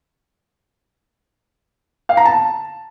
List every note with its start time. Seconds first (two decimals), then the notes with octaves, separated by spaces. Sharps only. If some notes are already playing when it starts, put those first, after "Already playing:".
2.09 F5
2.17 A#5
2.25 A5